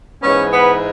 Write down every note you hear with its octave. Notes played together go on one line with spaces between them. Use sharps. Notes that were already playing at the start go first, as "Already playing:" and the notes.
G#2 E3 G#3 B3 C#4 C#5
B3 B4